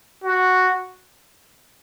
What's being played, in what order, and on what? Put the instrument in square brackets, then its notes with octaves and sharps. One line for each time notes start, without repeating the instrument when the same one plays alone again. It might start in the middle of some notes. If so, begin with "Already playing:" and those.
[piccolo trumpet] F#4